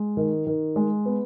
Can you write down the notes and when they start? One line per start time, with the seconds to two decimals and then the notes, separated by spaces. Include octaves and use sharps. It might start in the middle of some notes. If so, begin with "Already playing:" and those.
Already playing: G#3
0.17 D#3
0.47 D#3
0.76 G#3
1.06 B3